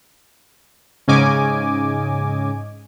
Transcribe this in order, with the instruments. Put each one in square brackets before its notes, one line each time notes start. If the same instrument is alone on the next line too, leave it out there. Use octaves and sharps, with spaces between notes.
[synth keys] G#2 C#3 C#4 D#5 G#5 D6